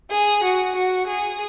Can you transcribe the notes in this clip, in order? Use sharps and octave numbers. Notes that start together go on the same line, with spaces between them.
G#4
F#4
F#4
G#4